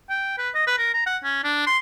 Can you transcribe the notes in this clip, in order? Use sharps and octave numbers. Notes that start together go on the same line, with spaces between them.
G5
B4
D#5
B4
A#4
A#5
F#5
C#4
D4
C6